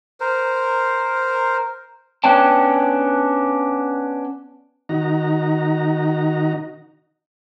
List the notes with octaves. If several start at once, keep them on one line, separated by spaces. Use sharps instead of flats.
A#4 C5
B3 C#4 D4 G5 A5
D#3 D#4 F#4 A#5